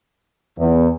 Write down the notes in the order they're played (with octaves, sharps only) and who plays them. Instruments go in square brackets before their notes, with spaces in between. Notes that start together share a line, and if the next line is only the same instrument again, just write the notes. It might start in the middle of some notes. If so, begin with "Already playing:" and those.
[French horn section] E2